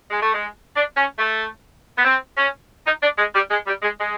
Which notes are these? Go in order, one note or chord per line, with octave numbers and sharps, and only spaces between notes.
G#3
A3
G#3
D4
C#4
A3
B3
C4
C#4
D#4
D4
G#3
G3
G#3
G3
G#3
G#3